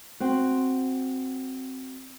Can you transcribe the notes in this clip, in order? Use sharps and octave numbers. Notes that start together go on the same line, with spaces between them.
C4 F#4